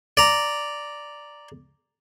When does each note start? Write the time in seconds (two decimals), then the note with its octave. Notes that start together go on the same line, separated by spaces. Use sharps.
0.17 D5 A#5